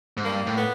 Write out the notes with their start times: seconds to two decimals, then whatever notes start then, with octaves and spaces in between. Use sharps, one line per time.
0.17 G#2
0.25 G2 A#3
0.47 A2
0.57 B3